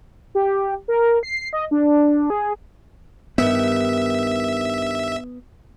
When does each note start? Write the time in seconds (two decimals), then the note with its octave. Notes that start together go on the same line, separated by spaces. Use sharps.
0.35 G4
0.88 A#4
1.23 C7
1.53 D#5
1.71 D4
2.30 G#4
3.38 G2 D#3 B3 E5